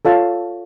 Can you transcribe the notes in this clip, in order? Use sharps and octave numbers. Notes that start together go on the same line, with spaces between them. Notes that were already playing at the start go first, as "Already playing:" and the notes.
F4 A4 C#5 F5 A5